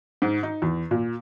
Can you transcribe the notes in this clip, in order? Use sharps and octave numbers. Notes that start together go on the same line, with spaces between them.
G#2
D#4
E2
A#2